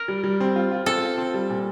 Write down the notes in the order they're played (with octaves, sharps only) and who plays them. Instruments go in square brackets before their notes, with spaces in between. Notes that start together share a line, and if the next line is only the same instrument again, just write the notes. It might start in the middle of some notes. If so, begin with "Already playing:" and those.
Already playing: [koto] A#4
[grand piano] G3
G3
C4
F4
F4
[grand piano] C4 [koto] A4
[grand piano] F4
C4
G3
A#2